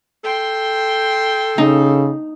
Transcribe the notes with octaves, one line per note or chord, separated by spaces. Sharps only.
A4 G5 C6
C#3 D#4